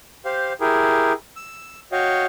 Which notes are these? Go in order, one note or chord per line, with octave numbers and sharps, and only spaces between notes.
G4 C5 F5
E4 G4 G#4 A#4
E6
F#4 C#5 D#5 F5 G5